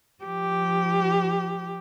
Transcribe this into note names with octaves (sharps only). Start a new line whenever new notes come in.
F3 G4